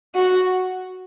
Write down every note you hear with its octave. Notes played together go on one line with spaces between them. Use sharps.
F#4